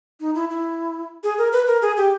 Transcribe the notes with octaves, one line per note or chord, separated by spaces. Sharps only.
D#4
E4
E4
G#4
A#4
B4
A#4
G#4
G4